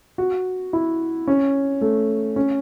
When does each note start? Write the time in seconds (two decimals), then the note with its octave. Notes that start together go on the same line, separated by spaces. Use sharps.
0.18 F#4
0.73 E4
1.28 C#4
1.81 A3
2.36 C#4